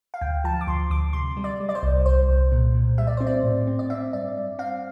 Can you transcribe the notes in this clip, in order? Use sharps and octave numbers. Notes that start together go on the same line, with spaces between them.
F5
D2 G5
F3 A5
D6
D2 C6
D2 D6
C3 C6
G3
D5
G3
D5
C5
C2
C2 C5
C2
A#2
A#2
G3 E5
D5
C4 C5
D5
A2
C4
D5
C4 E5
G2 D5
G2
C4 F5